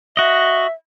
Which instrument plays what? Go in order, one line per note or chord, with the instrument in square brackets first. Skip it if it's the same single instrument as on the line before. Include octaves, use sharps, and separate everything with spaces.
[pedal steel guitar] F#4 D#5 [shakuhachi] E5